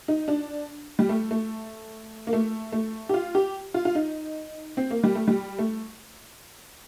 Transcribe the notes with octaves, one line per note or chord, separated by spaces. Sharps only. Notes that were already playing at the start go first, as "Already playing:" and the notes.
D#4
D4
G3
A3
A3
A#3
A3
A3
G4
F4
G4
F4
F4
D#4
C4
A#3
G3
A3
G3
A3